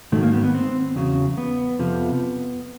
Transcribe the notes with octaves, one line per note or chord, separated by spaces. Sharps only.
G#2 D#3 F#3 A3
A#3
B3
B3
C4
E2 C#3 F#3
B3
F2 C3 F3